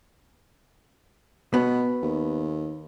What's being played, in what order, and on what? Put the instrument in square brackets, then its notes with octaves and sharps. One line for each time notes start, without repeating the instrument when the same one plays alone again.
[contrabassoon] B2 [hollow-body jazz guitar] B3
[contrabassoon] D#2